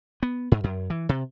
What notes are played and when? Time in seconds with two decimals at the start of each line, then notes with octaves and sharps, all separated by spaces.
0.23 B3
0.52 G#2
0.64 F#2
0.90 E3
1.09 C3